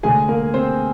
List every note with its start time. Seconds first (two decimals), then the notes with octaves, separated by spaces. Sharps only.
0.03 D2 D3 G#3 G#4 G#5
0.28 A#3 A#4
0.54 C4 C5